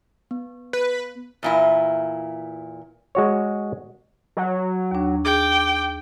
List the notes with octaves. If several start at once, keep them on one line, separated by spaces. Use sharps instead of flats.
B3
B4
E2 A#2 E4
G#3 F#4 C#5
F#3
D#2 D4
G#4 G5 D6